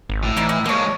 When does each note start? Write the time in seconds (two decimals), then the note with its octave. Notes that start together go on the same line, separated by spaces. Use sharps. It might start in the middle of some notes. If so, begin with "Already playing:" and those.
0.09 G#1
0.23 A2
0.36 E3 D#4 E4 D5
0.49 D#4
0.66 F3 G#3 A#3 D4 C#5